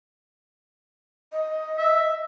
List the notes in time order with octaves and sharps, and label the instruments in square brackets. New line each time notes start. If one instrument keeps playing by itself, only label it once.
[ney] D#5
[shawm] E5